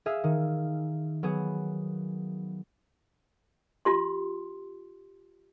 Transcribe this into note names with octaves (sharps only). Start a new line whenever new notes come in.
G#4 E5 F5
D#3
F#3 B3 G#4
F4 G4 C6